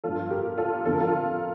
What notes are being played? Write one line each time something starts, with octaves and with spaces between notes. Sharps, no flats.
G2 F3 F4 A4
G4 A#4
F4 A4
F2 D3 F3 A4
A#4
F4 A4